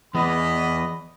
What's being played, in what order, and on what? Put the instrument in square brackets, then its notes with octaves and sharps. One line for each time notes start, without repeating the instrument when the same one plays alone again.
[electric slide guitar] E3 B3 G#4 [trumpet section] D#5 B5